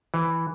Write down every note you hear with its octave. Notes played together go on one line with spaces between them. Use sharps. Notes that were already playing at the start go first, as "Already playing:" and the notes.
E3